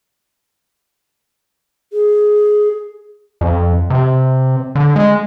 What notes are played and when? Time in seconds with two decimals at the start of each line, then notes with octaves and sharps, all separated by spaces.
1.93 G#4
3.41 F2
3.90 C3
4.75 D3
4.96 G#3